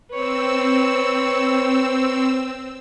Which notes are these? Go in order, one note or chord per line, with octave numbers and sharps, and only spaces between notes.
C4 B4 C#5 E6